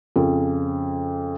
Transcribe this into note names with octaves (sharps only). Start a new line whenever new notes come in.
F2 C#3